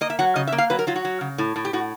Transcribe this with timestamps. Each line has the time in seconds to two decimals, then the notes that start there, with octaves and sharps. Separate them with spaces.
0.01 A#3 D#5
0.10 E5
0.19 F#3 F#5
0.36 C#3 D#5
0.47 E5
0.52 A#3
0.58 F5
0.70 F#3 B4
0.79 A#4
0.87 F#3 F4
0.96 F#4
1.05 F#3
1.21 C#3
1.38 A2
1.56 A2
1.65 G4
1.73 A2 F#4